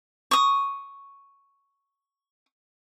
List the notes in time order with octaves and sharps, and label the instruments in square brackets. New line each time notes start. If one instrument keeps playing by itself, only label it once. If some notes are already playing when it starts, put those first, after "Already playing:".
[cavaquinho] C#6 D#6